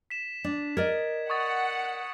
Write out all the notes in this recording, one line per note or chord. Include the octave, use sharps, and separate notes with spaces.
B6 E7
D4
A#4 D5 D#5 G#6
F#5 C#6 D#6 A6